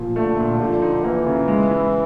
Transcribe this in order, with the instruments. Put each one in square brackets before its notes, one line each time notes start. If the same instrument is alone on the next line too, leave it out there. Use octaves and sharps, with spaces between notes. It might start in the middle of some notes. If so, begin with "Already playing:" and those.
Already playing: [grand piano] A#2 F3
[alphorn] D3 [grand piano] A3
[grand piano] A#2
[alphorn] D3 [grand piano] F3
[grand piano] D#4
[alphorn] E3 [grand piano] A#3
[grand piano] C#3
G#3
E4